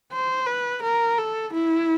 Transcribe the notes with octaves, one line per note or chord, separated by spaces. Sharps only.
C5
B4
A#4
A4
E4